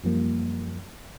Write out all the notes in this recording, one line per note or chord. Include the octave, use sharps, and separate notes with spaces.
F#2 F3 G3 A#3